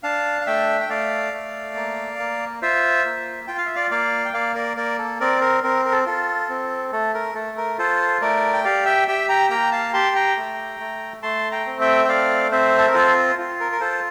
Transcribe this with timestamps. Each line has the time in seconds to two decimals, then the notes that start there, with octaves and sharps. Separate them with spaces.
0.03 D4 F5 A5
0.41 F5
0.46 A3 E5 G5
0.81 G5
0.89 A3 D5 F5
1.33 A3
1.75 A#3
2.19 A#3
2.62 F4 C5 E5
3.05 A#3
3.47 F4 G5
3.58 F5
3.66 E5
3.76 D5 F5
3.91 A#3 D5 F5
4.25 G5
4.33 A#3 D5 F5
4.55 A#4 D5
4.77 A#3 A#4 D5
4.99 A4
5.20 C4 A#4 D5
5.41 A#4
5.63 C4 A#4
5.85 A#4
5.92 A4
6.06 F4 A4
6.49 C4
6.92 A3 A4
7.14 A#4
7.35 A3 A4
7.57 A#4
7.78 F4 A4 C5
8.21 A3 A#4 D5
8.53 G5
8.64 G4 D5 F5
8.85 E5 G5
9.08 G4 E5 G5
9.29 G5 A#5
9.50 A#3 G5 A#5
9.72 F5 A5
9.93 G4 A5 C6
10.16 G5 A#5
10.37 A3
10.80 A3
11.23 A3 A5 C6
11.51 G5 A#5
11.66 C4
11.81 E5 G5
12.05 G5
12.08 A3 D5 F5
12.51 C4 C5 E5
12.79 A4
12.87 A#4
12.94 F4 A4 C5
13.39 F4
13.60 A#4
13.72 A#4
13.81 F4 A4 C5